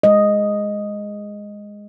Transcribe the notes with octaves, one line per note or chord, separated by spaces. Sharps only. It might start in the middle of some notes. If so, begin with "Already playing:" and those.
G#3 D#5